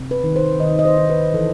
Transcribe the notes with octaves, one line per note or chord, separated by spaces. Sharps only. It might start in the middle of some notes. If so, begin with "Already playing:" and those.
Already playing: C3
B4
D#3
C5
D#3 D#5
D#5
C5
D#3
B4
E3 A4